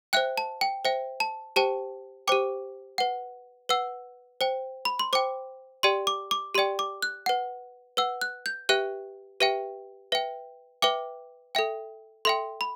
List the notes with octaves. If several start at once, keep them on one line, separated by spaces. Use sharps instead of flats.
C5 E5 G5 F#6
A5
G5
C5 E5 G5
A5
G4 C5 G5 A5
G4 C5 G5 D6
B4 F#5
B4 F#5 E6
C5 G5
B5
C6
C5 G5 D6
G4 D5 G5 C6
D6
D6
G4 D5 G5 C6
D6
F#6
B4 F#5
B4 F#5 E6
F#6
G6
G4 B4 E5 G5 F#6
G4 B4 E5 G5
B4 E5 G5
B4 E5 G5 D6
A4 E5 G5
A4 E5 G5 C6
B5